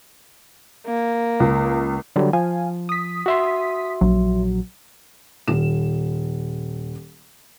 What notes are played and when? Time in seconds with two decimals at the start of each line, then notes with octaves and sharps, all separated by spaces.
0.87 A#3
1.40 C#2
2.16 D3 F#3 G3
2.33 F3 F5 G#5
2.89 D#6 B6
3.26 F#4 E5 C6
4.01 A#1 F#3
5.48 D#1 E7